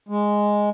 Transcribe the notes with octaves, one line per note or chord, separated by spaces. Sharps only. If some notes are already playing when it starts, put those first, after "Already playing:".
G#3